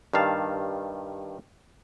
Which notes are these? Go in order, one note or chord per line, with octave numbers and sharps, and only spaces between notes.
G2 D#3 F5 A5